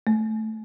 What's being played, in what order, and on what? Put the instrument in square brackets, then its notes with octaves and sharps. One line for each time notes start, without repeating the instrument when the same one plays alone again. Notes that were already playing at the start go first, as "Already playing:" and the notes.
[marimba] A3